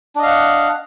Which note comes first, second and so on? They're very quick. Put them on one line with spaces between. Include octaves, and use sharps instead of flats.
D4 D#5 F5 F#5